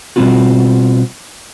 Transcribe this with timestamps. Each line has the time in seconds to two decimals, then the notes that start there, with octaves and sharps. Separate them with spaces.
0.16 B2 G3 G#3 C4 F4 F#4